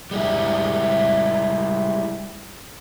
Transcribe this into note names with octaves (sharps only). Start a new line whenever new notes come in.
G3 G#3 E4